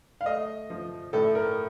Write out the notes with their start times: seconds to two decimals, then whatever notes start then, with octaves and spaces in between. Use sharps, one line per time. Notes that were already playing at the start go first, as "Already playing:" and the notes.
0.21 F5
0.26 A3 D#5
0.70 F3
1.13 A2 A4
1.35 A#4